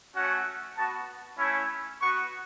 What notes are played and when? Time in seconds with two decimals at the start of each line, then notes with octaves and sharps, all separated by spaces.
0.14 A3 C#4 F#4 F#5
0.76 B3 F#4 A5
1.37 A3 C#4 E4
1.99 B3 F#4 C#6